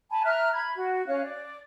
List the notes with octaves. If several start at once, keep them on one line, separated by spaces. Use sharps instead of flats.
G#5 A5 B5
E5 A#5 F6 F#6
B5 G#6
F#4
C#4 F5 F#6
D5